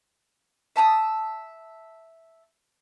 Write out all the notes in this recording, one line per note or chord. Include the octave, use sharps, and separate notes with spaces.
E5 A5 A#5 D#6